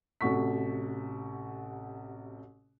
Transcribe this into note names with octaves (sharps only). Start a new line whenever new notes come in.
A1 C3 A3 F#4 C#6 B6